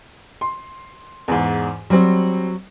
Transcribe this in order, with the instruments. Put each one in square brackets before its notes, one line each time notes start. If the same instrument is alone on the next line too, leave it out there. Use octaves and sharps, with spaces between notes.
[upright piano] C6
E2 G#2
[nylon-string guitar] F#3 [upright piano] G3 C4